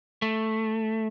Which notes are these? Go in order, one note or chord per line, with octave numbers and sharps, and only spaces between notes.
A3